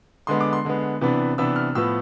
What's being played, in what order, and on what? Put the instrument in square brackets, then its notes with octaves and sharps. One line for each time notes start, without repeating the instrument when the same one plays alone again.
[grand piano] D3 G#3 B3 C6
D6
C6
D3 G#3 B3
C3 E3 B3 D4
C3 E3 B3 D4 E6
F6
A2 F3 B3 E6